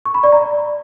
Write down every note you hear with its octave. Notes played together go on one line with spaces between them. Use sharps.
C#6
B5
D5
A#5